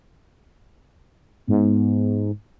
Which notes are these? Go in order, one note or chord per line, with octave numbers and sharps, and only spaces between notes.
G#2 B3